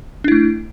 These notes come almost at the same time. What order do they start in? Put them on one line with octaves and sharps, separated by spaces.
D4 E4 A3